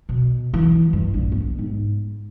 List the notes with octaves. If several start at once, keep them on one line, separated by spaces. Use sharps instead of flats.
B2
E3
G2
A#1
B3
G#2